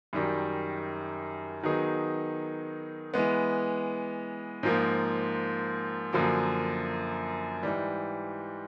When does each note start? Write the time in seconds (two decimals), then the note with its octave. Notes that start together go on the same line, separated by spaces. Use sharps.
0.13 F#2 D#3 G3
1.63 D#3 F#3 B3 D#4 G#4
3.14 E3 G#3 B3
4.63 G#2 F3 A#3
6.13 F#2 D3 F3 A#3
7.63 G#2 E3 G3